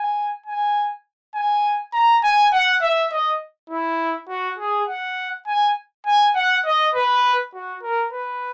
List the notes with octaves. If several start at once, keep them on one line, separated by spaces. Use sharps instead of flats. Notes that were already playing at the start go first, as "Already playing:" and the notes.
Already playing: G#5
G#5
G#5
A#5
G#5
F#5
E5
D#5
E4
F#4
G#4
F#5
G#5
G#5
F#5
D#5
B4
F#4
A#4
B4